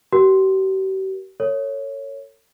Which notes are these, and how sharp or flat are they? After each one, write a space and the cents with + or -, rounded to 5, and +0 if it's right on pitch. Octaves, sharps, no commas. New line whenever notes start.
G4 -40 A#4 +35
A4 +40 C#5 +0